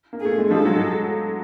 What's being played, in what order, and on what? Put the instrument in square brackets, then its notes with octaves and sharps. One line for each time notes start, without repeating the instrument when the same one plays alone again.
[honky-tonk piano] A#3
[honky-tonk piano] A3 [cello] G#4
[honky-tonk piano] G#3
[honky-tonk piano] F3 G3 [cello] A4
[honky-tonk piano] F#3 G#3